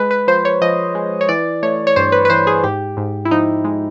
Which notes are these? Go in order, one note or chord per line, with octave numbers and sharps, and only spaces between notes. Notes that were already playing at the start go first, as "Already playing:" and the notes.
Already playing: G#3 B4
B4
F3 C5
C#5
F3 D#5
G#3
C#5
E3 D5
A3 C#5
C#5
G2 C5
B4
B4
E3 C5
G#4
G#2 G4
G#2
E4
F3 D#4
G#3